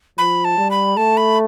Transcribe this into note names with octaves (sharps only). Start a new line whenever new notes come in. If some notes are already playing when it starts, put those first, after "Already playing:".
F3 B5
A5
G3
B5
A3 A5
B5